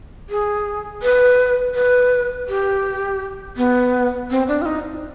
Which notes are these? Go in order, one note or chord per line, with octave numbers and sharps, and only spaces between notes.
G#4
B4
B4
G4
B3
C4
D4
F4
D#4